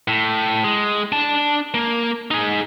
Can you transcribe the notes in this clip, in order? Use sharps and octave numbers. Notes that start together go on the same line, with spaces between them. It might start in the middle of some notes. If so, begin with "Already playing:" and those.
A2
G#3
D4 A5
A#3
D#4 G#4